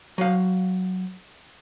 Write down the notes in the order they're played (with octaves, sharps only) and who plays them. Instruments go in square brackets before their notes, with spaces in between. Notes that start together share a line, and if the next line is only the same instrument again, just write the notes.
[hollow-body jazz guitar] F#3 F5